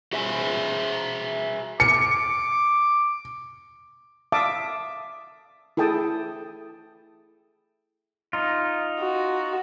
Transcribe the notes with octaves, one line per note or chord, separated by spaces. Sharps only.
F#4 G#4 C5 E5 F#5 G#5
D6 C#7
E5 F5 A5 D6 D#6
E4 G#4 A4 G5 A5 D#6
D#4 F4
F#4